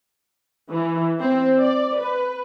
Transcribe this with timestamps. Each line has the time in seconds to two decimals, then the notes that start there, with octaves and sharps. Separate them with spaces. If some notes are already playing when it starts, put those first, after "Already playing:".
0.70 E3
1.20 C4
1.60 D5
1.99 B4